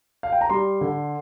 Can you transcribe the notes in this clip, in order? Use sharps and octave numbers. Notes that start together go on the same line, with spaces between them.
F5
G5
A#5
G3 C6
D3